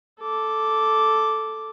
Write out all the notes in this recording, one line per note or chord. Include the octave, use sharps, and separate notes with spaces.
A4 D6